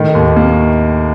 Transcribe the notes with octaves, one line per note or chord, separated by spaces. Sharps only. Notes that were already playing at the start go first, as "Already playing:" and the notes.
Already playing: A2 D#3
D#2
A#3